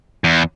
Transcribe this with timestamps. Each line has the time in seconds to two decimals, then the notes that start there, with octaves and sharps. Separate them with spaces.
0.24 E2